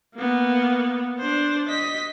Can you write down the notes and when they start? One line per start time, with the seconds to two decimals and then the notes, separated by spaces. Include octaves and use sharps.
0.16 A#3 B3
1.19 D4 C5
1.69 D#5 B6